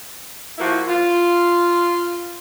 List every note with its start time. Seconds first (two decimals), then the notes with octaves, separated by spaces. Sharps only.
0.58 F3 A#3 E4 F#4
0.87 F4